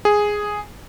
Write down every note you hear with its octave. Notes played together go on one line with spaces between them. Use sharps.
G#4